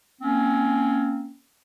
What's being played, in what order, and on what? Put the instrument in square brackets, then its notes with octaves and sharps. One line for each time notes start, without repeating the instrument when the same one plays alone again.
[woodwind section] A#3 C4 C#4